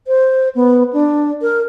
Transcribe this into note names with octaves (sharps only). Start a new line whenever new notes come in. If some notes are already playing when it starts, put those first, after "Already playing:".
C5
B3
D4
A#4